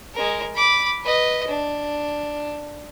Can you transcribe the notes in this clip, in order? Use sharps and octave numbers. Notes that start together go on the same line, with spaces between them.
G#3 A#4
B5 D6
B4 D#5
D4